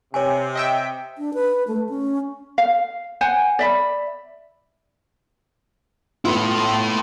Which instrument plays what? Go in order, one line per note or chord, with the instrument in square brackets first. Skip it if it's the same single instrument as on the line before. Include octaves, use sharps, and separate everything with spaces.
[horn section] C3 [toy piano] C#5 G#5
[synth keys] D#5 E5 G5
[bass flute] D4
B4
A3
C#4
[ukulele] F5
C5 F#5 G#5
D5 E5 B5
[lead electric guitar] A3 E4 [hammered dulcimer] B3 F4